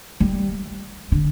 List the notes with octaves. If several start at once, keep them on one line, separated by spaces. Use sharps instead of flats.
G3
D3